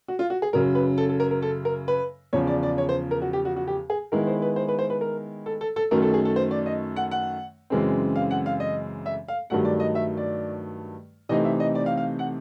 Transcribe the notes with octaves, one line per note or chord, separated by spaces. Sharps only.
F#4
F4
F#4
G#4
F#2 C#3 F#3 A#4
B4
A4
A4
A#4
A#4
A4
A#4
B4
E2 C#3 F3 C#5
D5
D5
C#5
C5
A#4
F#4
G4
F#4
F#4
G4
G#4
D#3 G#3 B3 E4 A#4
C5
B4
C5
B4
C5
B4
A#4
A4
A4
A4
F#2 D#3 F#3 A3 A#4
A4
G#4
A4
C5
D5
D#5
F#5
F#5
F#2 C#3 E3 G#3 C4
F5
F#5
F5
D#5
E5
F5
G2 D#3 F#3 A3 F#5
D5
D#5
E5
D5
C3 E3 A3 C4 D#4 D#5
E5
D#5
D5
F5
F5
F#5